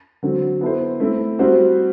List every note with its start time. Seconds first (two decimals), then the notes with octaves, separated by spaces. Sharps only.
0.23 D3 F#3 C4
0.61 B3 E4 A4 C5
1.00 A3 C4 E4
1.39 G3 C4 F#4 C5